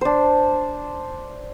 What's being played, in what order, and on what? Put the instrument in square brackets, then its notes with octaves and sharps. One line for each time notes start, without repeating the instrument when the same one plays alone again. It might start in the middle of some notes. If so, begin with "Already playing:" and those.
[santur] D4 C5